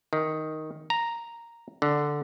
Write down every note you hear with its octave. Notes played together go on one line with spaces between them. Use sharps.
D#3
A#5
D3